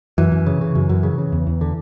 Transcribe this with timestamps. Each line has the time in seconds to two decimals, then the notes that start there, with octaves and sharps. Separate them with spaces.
0.18 F#2 E3
0.31 F#2
0.46 C#3
0.61 C#3
0.75 F#2
0.89 F#2
1.03 C#3
1.18 C#3
1.32 E2
1.47 E2
1.61 D3